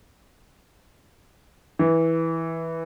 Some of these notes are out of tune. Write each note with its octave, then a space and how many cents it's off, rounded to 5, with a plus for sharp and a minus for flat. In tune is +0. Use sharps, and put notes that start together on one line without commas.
E3 -10